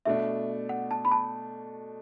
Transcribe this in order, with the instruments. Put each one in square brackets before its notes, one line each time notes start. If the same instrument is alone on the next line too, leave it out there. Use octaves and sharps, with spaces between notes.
[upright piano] B2 A3 D4 [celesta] E5
[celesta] F#5
A5
B5
A5